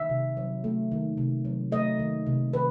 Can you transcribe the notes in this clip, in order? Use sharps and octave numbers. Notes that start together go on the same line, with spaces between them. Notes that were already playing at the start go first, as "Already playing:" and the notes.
Already playing: D#3 E5
C3
F#3
A3
D#3
C3
F#3
A3 D#5
D#3
C3
D#3 B4